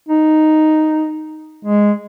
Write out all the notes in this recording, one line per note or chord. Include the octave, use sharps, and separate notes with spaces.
D#4
G#3